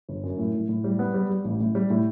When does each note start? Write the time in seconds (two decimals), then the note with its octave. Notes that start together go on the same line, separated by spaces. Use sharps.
0.09 G1
0.23 F#2
0.38 A2
0.54 A2
0.69 A2
0.84 G3
0.99 B3
1.14 G3
1.30 G3
1.44 A1
1.60 A2
1.75 G3
1.90 A2